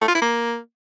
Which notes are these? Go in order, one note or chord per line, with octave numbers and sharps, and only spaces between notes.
A3
F4
E4
A#3